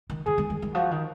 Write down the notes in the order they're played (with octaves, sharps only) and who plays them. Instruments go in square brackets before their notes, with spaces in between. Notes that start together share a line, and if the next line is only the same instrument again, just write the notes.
[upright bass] D#3
[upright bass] D#3 [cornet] G#4
[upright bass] D#3
D#3
D#3
[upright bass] F3 [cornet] F#4
[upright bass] D#3